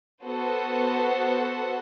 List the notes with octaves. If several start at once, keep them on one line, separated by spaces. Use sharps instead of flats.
B3 F#4 A4 C5 F#5